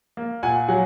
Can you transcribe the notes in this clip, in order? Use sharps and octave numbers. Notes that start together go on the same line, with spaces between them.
A#3
A#2 F#5 G#5
F#3 F#5 G#5